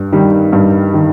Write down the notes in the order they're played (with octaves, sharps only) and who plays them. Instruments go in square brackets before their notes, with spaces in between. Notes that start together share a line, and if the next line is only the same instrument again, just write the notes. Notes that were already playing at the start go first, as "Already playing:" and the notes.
Already playing: [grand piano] G2
D#3 G3
G2
D#3